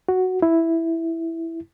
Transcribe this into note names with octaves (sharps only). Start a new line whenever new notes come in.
F#4
E4